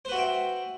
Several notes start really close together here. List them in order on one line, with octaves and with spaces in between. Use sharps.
C5 B4 F#4 E5 G5